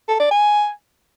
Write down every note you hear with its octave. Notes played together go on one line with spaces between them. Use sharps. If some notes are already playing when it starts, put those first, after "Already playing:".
A4
D5
G#5